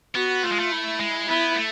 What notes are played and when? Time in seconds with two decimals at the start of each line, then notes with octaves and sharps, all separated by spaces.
0.15 B3 F#4
0.43 A3 F4
0.52 G#3
0.60 A3
0.72 E4
1.00 G#3
1.28 B3 E4
1.56 A3